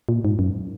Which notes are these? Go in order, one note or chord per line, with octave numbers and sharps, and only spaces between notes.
A#2
G#2
F#2